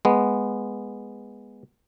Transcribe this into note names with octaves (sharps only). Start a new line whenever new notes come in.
G#3 B3